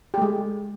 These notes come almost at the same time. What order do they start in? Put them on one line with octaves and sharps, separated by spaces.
G4 A3 G#3